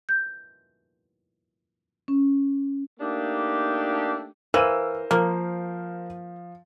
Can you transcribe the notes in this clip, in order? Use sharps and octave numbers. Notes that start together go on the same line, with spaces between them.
G6
C#4
A3 A#3 D4 D#4 G4
E3 A#4 C5 F5 E6 D#7
F3 A#3